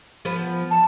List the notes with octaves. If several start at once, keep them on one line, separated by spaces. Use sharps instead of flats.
F3 B3
A5